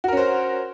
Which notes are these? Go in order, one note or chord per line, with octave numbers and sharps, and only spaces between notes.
C#4 F#4 A#4 C5